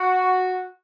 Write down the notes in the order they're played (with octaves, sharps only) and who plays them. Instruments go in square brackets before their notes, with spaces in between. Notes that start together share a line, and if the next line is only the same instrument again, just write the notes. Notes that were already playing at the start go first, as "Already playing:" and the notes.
Already playing: [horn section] F#4